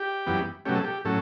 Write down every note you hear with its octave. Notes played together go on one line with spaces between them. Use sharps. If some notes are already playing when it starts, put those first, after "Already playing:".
Already playing: G4
F#2 E3 G3 B3
B2 F#3 A3 C#4 G4
A4
G4
A2 F#3 C#4 A4